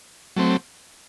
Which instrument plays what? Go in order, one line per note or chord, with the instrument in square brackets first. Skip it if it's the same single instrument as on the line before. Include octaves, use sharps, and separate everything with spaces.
[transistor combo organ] F#3 A3 C4